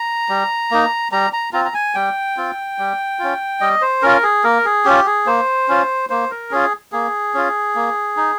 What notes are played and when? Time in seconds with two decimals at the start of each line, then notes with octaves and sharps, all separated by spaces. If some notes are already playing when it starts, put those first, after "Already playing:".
Already playing: A#5
0.29 G3
0.71 A#3 D#4
1.12 G3 A#5
1.33 A#5
1.53 C4 F4 A#5
1.65 A#5
1.74 G#5
1.95 G3 G5
2.37 C4 F4
2.78 G3
3.19 C#4 F4
3.61 G3 D#5
3.81 C5
4.02 C#4 F4 A#4
4.23 G#4
4.44 A#3 A#4
4.65 G#4
4.85 C#4 F4 G4
5.06 G#4
5.26 A#3 C5
5.68 C#4 F4
6.10 A#3 C5
6.31 A#4
6.51 C#4 F4 G#4
6.92 A#3 G#4
7.34 C#4 F4
7.75 A#3
8.17 D#4